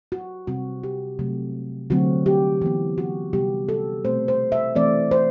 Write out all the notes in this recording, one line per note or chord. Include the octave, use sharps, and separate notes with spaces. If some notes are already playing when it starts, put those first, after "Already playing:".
F#4
C3 G3 C4 F#4
G4
C3 F#3 A3
D3 F#3 A3 C4 F#4
G4
E3 B3
F#4
C3 G3 B3 G4
A4
B2 A3 C4 C5
C5
E5
E3 A3 C4 D5
C5